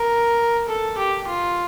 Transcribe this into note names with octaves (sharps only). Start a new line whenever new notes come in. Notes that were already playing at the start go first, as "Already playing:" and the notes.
Already playing: A#4
A4
G4
F4